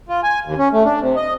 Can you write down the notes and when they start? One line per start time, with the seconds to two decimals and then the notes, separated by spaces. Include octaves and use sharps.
0.09 F4
0.23 G#5
0.45 D#2
0.58 C#4
0.73 A3
0.85 D4
1.00 C3
1.16 D#5